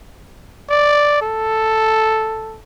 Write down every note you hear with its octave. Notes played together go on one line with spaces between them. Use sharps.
D5
A4